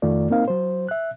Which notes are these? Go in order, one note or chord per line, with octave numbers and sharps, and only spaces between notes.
F2 D#3 A3 F4 D5
A#3 C4 D#4 A#4 F5
F#3 C5
E5 F#6